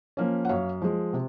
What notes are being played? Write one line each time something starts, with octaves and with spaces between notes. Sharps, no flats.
F3 A#3 C#4
F#5
F#2 C#5 F5
F3 G#3
C3